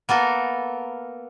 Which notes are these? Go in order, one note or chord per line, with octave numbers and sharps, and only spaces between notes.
A#3 B3 A4 A#4